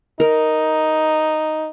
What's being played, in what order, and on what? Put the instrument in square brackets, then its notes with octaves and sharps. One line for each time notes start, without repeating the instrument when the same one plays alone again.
[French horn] D#4 [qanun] A#4